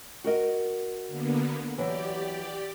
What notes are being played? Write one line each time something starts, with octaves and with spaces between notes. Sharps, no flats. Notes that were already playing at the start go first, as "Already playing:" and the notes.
F#4 A#4 D#5
D3 A#3 B3
E3 F#3 G4 D5